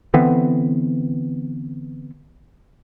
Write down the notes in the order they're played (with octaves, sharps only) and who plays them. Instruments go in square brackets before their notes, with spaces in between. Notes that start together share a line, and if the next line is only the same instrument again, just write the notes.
[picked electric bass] D3 E3 B3 C4